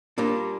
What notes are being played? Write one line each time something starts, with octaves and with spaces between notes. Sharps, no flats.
A#2 G3 A#3 D4